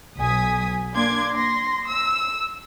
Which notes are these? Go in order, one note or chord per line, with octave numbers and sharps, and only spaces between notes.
B1 F#3 G#5 D#6 B6
A#3 D4 C6 D6 G#6
C6 A#6
E6